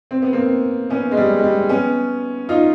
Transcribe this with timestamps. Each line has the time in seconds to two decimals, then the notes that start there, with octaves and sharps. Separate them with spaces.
0.11 C4
0.22 B3
0.33 A#3 C4
0.90 B3 C#4
1.11 G#3
1.17 G3
1.39 G#3
1.44 G3
1.69 B3 C#4
2.49 D#4 F4